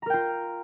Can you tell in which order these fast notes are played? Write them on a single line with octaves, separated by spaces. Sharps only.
A#5 A#4 G5 F4